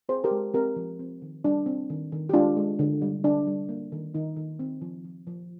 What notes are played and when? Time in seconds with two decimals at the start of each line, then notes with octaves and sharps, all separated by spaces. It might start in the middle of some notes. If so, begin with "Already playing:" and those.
0.09 C4 G#4 C5
0.24 G4 A#4
0.31 G#3
0.54 C4 G4 A#4
0.76 F3
0.99 C4
1.22 D#3
1.44 G3 D4
1.66 C4
1.90 D#3
2.12 D#3
2.29 G4
2.34 G#3 D4 F4
2.57 G#3
2.79 D3
3.02 G3
3.24 D3 D4
3.47 G3
3.69 A#3
3.92 D#3
4.14 D#3 D#4
4.37 D#3
4.59 C4
4.82 F3
5.05 F3
5.27 F3